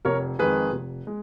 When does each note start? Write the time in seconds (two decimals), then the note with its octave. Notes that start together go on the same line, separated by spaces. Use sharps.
0.05 F1 A#4 C#5
0.39 F2 D#3 G#3 G#4 B4
0.72 F1
1.07 G#3